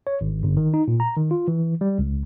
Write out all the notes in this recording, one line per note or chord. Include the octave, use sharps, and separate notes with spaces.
C#5
G#1
G1
D#3
D#4
A#2
A#5
D#3
F4
E3
G3
C#2